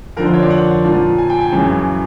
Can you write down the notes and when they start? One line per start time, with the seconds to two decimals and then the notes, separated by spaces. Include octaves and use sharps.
0.17 F2 D3 F3 A#4
0.25 C5
0.33 C#5
0.42 D5
0.50 F#5
0.84 A#2 F3
1.18 G#5
1.30 G5
1.41 G#5
1.52 F#2 C#3 E3